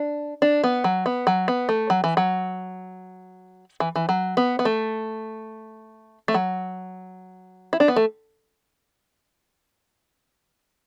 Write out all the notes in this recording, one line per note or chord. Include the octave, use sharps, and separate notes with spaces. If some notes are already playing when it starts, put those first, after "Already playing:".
Already playing: D4
D4
B3
F#3
B3
F#3
B3
A3
F#3
E3
F#3
E3
E3
F#3
B3
B3
A3
A3
F#3
E4
D4
B3
A3